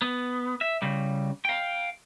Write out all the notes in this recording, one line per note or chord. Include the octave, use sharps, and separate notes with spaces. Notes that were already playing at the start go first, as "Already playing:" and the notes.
B3
E5
C#3 G3
F5 G5